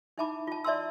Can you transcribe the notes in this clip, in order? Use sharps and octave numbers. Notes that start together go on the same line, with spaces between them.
D#4 E4 E5 A5 B5 D6
F4 A5
D5 E5 A5 A#5 C6 E6